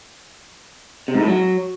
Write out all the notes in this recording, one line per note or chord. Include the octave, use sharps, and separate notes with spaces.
C3
G#2
A2
F#3